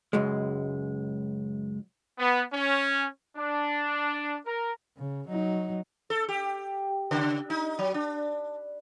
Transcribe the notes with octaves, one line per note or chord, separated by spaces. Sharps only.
C#2 F#2 G#3
B3
C#4
D4
A#4
C#3
F#3 D#4
A4
G4
C#3
D#4
F#3
D4